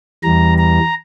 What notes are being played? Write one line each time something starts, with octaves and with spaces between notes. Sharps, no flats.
E2 E3 G3 A#5
A#5